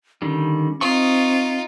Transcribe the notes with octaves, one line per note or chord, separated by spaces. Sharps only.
D3 D#3 G3 C#4
C4 D#4 F4 C#6 D#6